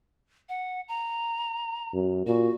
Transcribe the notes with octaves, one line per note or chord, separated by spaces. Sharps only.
F#5
A#5
F#2
A#2 F#4